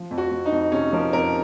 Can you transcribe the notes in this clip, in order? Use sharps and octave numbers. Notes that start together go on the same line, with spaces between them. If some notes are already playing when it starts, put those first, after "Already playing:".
Already playing: F3
F2
F#4
F2
D#4
F2
C3 C#4
F3 A#4
F2 A#4